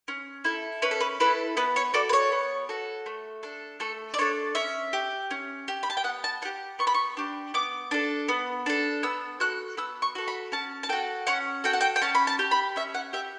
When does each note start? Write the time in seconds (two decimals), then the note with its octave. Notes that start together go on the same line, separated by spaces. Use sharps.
0.08 C#4
0.45 E4 A4
0.82 C#4 B4
0.91 A4
1.01 B4
1.20 E4 A4 B4
1.57 B3 B4
1.76 C#5
1.94 F#4 A4 D5
2.09 B4
2.13 C#5
2.32 B3
2.69 F#4 A4
3.06 A3
3.43 D4 A4
3.80 A3 A4
4.14 D5
4.18 D4 A4 C#5
4.55 C#4 E5
4.93 G4
5.31 C#4
5.68 G4
5.83 B5
5.90 A5
5.97 G5
6.04 B3 F#5
6.24 A5
6.42 D4 F#5
6.45 G4
6.79 B3 C#6
6.87 B5
6.94 C#6
7.17 D4 G4
7.54 B3 D6
7.91 D4 A4
8.28 B3
8.66 D4 A4
9.03 B3 E6
9.40 F#4 A4 F#6
9.77 B3 E6
10.02 C#6
10.15 F#4 A4
10.28 B5
10.52 C#4 A5
10.83 A5
10.89 F#4 A4 G5
11.27 C#4 F#5
11.64 F#4 A4 G5
11.73 F#5
11.81 G5
11.96 G5
12.01 C#4 A5
12.15 B5
12.27 A5
12.39 G4
12.51 B5
12.76 C#4 E5
12.94 F#5
13.13 G4 E5